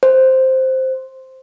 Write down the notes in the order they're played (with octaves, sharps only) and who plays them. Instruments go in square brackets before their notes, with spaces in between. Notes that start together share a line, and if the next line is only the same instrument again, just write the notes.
[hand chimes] C5